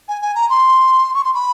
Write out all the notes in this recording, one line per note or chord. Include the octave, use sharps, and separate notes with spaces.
G#5
G#5
A#5
C6
C#6
C6
B5